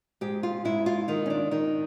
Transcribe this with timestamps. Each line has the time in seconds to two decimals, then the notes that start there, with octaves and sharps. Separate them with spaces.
0.21 G#2 G4
0.43 F4
0.65 G#2 E4
0.86 F4
1.08 D#3 D#4
1.26 C#4
1.30 D4
1.51 D#3 D#4